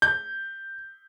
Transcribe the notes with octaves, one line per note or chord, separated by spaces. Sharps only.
G6